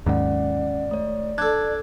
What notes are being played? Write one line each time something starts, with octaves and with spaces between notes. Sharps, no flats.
D#2 G#2 C#4 D5 F#5
A3 C#5
D4 A4 F#6 G#6